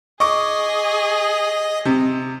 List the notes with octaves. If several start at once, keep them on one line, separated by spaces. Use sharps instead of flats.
G#4 D#5 C#6 D6
C3